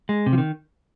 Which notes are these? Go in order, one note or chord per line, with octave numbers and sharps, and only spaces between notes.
G#3
C3
F3
D#3